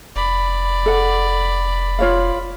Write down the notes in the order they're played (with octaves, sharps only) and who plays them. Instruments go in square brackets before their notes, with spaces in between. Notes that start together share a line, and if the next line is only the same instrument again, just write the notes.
[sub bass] F1 [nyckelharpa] D5 B5
[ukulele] A4 F#5
F4 C#5 F5